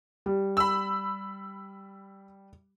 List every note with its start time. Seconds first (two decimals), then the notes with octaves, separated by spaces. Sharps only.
0.26 G3
0.57 B5 E6